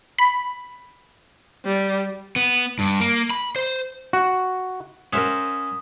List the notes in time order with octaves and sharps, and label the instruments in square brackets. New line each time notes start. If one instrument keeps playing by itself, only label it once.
[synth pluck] B5
[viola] G3
[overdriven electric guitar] B3
G2
A#3
B5
C5
[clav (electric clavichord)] F#4
[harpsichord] C#4 E5 [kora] A#4 C5 F#5 [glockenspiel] D#6